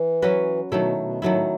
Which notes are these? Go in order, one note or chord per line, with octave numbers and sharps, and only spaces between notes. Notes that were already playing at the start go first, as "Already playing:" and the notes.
Already playing: E3
F#3 C#4 F#4 B4
B2 D#3 F#3 A3 E4
B2
A2 D#3 F#3 A3 E4